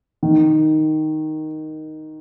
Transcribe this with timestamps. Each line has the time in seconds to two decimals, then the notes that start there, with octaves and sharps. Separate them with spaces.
0.23 D#3